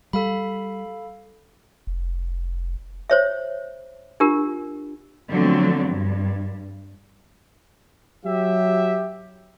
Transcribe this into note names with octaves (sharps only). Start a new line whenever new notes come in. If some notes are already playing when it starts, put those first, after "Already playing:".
G3 A4 F5 B5
F1
C5 C#5 E5
D4 F4 G4 A#4
D3 F3 F#3 A3 B3 C4
G2
F#3 G4 E5